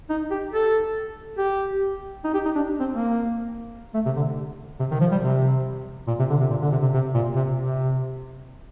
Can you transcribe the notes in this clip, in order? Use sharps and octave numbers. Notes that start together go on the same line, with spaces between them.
D#4
G4
A4
G4
D#4
G4
D#4
D4
C4
A#3
A3
C3
D3
C3
D#3
F3
G3
C3
A#2
C3
D3
C3
A#2
D3
C3
C3
C3
A#2
C3
C3